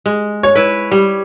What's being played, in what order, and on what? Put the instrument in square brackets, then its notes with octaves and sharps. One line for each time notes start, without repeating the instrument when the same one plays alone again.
[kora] G#3
[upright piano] C#5
[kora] E4 B4
G3